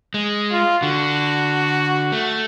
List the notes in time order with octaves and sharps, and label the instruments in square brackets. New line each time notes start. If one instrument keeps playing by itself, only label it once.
[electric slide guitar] G#3
[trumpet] F4
[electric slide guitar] D3 [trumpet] F#4
[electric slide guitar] A3